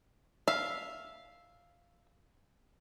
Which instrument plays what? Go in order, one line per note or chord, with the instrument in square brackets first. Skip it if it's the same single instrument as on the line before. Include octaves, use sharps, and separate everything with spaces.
[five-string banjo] E5 [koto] F5